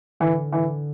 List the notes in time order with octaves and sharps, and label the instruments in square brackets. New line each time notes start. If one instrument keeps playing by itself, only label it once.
[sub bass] D3 [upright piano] E3
[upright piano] E3